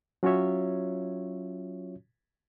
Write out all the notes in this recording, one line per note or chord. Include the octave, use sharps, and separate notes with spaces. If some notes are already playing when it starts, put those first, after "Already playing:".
F#3 C#4 F4 F#4 C#5 E5